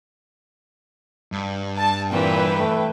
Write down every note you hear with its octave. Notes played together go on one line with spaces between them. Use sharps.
G2
A5
A#2 E3 C4 B4 G5
A3